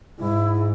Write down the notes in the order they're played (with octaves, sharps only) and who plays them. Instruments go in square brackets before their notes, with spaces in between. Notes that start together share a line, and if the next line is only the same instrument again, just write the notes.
[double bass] G#2 [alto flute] E4